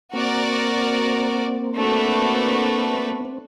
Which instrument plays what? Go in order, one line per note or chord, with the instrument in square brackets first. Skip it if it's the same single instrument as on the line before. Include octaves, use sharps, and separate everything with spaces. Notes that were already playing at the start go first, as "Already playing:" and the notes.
[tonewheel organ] A#3 C4 [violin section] F#4 A#4 D5
[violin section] A3 D4 F#4 B4
[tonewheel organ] A#3
B3
C4